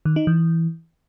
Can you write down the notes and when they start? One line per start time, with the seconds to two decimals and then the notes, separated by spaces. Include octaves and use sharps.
0.05 D#3
0.16 D#4
0.27 E3